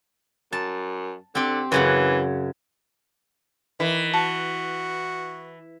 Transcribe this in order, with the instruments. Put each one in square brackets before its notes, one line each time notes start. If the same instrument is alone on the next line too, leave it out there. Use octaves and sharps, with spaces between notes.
[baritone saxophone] F#2 [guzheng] A5
[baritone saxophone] D3 [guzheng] C4 G4
[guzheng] F#2 C#3 F#5 [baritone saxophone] E3
[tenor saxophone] D#3 [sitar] E3
[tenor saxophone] F#4 [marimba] A5